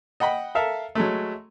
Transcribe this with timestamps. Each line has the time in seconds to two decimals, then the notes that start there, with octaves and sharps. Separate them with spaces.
0.20 D#5 F#5 G5 B5
0.55 A4 A#4 E5 F5
0.95 F#3 G#3 A3